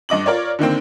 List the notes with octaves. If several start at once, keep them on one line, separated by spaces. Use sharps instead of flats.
G2 D#5 D6 F#7
F4 A#4 C#5 D5
D3 D#3 A#3 C4